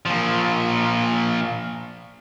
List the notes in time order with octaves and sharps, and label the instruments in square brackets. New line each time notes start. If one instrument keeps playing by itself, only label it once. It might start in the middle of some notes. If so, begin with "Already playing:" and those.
[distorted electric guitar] A#2 F3